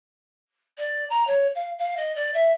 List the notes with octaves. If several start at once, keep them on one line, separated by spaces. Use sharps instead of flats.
D5
A#5
C#5
F5
F5
D#5
D5
E5